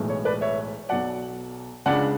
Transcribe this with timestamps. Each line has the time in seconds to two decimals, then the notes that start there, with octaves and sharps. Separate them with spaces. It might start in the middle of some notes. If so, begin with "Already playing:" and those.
Already playing: B1 A2 E3 G#3
0.09 C#5
0.25 B4 D5
0.41 C#5 E5
0.89 B1 B2 F#3 D5 F#5
1.86 C#2 C#3 G#3 D4 D5 F#5